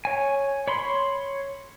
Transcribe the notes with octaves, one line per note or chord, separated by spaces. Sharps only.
C#5 G#5
C#5 B5 C6